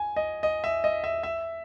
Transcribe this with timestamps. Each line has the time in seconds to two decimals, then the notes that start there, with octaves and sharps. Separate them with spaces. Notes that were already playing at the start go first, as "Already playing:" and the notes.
Already playing: G#5
0.16 D#5
0.43 D#5
0.64 E5
0.84 D#5
1.04 E5
1.23 E5